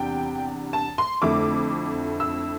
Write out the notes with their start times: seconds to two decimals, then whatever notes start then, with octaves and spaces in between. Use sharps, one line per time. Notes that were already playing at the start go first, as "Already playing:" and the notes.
Already playing: E2 C3 G3 D4 G5
0.73 A5
0.98 C6
1.22 F2 D3 A3 E4 D6
2.20 E6